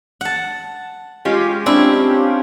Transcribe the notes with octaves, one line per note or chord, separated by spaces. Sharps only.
F#5 A5
G#3 C#4 F4 G4
C4 D4 E4